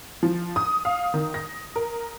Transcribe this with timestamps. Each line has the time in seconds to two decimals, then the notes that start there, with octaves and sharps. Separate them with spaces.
0.23 F3
0.56 D#6
0.85 F5
1.14 D#3
1.34 A#6
1.76 A#4